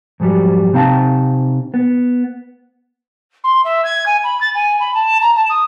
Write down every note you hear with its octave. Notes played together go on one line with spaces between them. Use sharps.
F2 G#2 F#3 G3
C3 C4 D#4 F5 A5 A#5
B3
C6
E5
G#6
G#5
B5
A6
G#5
B5
A5
A#5
A5
D#6